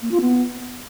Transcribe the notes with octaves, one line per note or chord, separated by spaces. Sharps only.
A#3
F4
B3